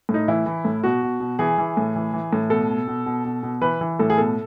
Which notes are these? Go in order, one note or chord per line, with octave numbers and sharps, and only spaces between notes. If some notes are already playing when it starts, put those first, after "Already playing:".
A2
D#4
E3 E4
E3
A2
B2 F#4
B2
B2
E3 G#4
E3
A2
E3
E3
A2
B2 A4
B2
B2
B2
B2
B2
E3 B4
E3
A2 A4
G#4
B2 A4